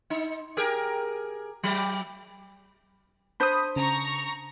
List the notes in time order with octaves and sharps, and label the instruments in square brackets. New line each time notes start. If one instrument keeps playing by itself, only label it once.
[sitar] D#4
G4 G#4 A#4
F#3
[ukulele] D4 C5 [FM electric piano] B5 D#6
[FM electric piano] C#3 [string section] A#5 C#6